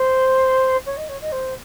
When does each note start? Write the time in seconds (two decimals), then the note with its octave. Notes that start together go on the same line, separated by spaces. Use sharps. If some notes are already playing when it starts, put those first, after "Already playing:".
Already playing: C5
0.86 C#5
0.97 D#5
1.09 C#5
1.21 D#5
1.32 C5